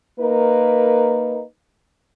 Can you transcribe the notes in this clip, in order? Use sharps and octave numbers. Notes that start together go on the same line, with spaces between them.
A#3 D#4 A#4 B4